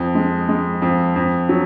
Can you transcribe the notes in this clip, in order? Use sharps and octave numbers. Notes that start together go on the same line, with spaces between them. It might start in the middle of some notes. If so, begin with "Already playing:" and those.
Already playing: F2
G#3
G#3
F2
F2
F#3